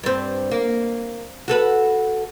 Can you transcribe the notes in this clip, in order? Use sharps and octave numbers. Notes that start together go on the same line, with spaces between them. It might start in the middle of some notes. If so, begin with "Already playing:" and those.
G2 C4
A#3
F#4 A4 B4